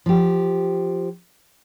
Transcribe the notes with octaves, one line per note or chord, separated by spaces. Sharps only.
F3 G4